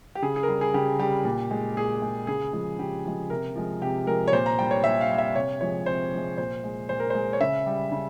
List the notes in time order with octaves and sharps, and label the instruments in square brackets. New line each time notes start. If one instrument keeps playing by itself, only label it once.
[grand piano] G4
C#3 G#4
G#4
A#4
G3 G#4
G#4
C#3 G4
G3 G4
A#2
G#3
A#2 G#4
G#3
C#3 G#4
F3 G#3
C#3 G4
F3 G#3
C3 A#4
F3 G#3
C3 G4
F3 G#3 A#4
C#5
A#2 C5
A#5
G3 G5
C#5
A#2 E5
F5
G3
E5
C3 C#5
F3 G#3 C#5
C3 C5
F3 G#3
A#2 C5
G#3
A#2 C5
A#4
G#3 C5
C#5
C#3 E5
G3
C#3